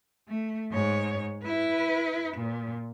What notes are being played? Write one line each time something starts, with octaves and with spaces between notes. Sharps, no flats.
A3
G#2 C#5
E4 B4
A#2